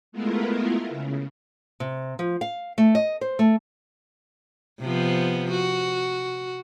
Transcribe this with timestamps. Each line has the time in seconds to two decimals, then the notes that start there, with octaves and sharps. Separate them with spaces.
0.12 G#3 A3 B3 E4 F4 A#4
0.89 C#3
1.80 C3
2.19 F3
2.41 F5
2.78 A3
2.95 D#5
3.21 C5
3.39 A3
4.80 C3 F3 B3
5.51 F#4